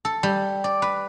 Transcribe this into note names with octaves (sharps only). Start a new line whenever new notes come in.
A4
G3
D5
B4